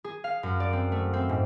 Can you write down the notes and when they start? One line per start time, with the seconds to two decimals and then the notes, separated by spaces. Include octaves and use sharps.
0.04 G#4
0.24 F5
0.43 F#2
0.60 D5
0.73 C4
0.92 A3
1.13 C4
1.29 G#2